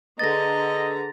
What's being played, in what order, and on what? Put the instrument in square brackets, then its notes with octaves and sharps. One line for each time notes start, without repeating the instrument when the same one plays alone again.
[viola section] D3 A#5 [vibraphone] G#4 B4 [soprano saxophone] D#5 [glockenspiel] A6 A#6